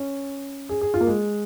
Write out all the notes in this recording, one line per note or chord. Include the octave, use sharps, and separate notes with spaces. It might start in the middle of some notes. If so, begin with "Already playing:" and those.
Already playing: C#4
G#4
G#4
F4
A#3
G#3